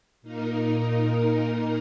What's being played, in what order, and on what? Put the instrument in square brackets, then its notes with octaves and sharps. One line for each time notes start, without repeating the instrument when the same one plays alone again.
[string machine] A#2 A#3 D#4 A#4